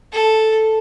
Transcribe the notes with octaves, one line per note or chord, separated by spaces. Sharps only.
A4